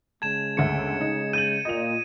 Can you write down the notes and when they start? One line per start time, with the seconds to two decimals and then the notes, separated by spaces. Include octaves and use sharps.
0.22 C#3 G#3 A5 G#6 E7
0.57 G1 D2 E5 C#7
1.01 D#4
1.33 G6 A6 D#7 F#7
1.65 A#2 D#5 F7